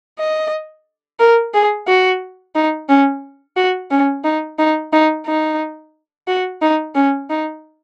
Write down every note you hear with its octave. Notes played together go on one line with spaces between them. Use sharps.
D#5
A#4
G#4
F#4
D#4
C#4
F#4
C#4
D#4
D#4
D#4
D#4
F#4
D#4
C#4
D#4